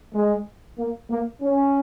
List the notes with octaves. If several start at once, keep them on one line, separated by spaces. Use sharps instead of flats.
G#3
A#3
A#3
C#4